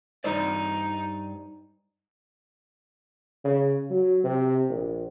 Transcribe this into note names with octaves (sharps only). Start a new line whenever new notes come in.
G2 D#4 C5 D5
C#3
F#3
C3
A#1